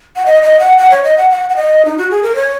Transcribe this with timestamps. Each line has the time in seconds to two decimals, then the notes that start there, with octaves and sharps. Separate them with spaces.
0.16 F#5
0.26 D#5
0.43 D#5
0.60 F#5
0.78 F#5
0.90 C#5
1.04 D#5
1.18 F#5
1.30 F#5
1.50 F#5
1.56 D#5
1.85 D#4
1.98 F#4
2.11 G#4
2.23 A#4
2.36 C#5